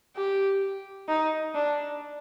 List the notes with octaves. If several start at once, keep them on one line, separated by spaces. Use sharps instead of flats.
G4
D#4
D4